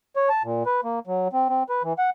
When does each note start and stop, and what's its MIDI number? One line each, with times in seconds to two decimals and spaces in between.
0.16 0.29 73
0.29 0.43 81
0.44 0.63 46
0.66 0.81 71
0.84 0.99 58
1.07 1.28 54
1.33 1.48 60
1.49 1.63 60
1.69 1.83 71
1.83 1.93 52
1.98 2.10 78